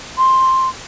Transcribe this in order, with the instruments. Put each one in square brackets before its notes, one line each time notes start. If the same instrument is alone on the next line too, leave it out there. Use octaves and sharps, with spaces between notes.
[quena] C6